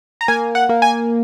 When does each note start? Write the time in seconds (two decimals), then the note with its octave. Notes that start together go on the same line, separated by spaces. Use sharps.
0.21 A#5
0.28 A#3 G#5
0.55 F#5
0.69 A#3
0.82 G#5